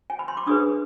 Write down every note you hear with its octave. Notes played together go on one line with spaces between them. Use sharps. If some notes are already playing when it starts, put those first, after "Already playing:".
G#5
B5
C6
D6
D4 G#4 B4 D#6